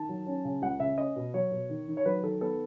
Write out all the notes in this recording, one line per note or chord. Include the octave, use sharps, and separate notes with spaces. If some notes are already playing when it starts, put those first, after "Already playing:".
Already playing: D#3 A5
F#3
C#4
C#3
C#2 F#5
C#3 E5
C#4 D#5
B2
F#3 C#5
B2
D#3
D#3
C#5
F#3 B4
D#3 A4
B3 A4